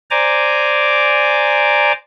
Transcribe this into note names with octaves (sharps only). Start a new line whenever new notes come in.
C5 D5 G#5 A#5 D6